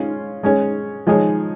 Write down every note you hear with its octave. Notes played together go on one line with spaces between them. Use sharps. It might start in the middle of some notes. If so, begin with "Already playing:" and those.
Already playing: G#3 C#4 F4 C#5
G#3 C#4 G#4 C#5
F3 G#3 D#4 G#4 C#5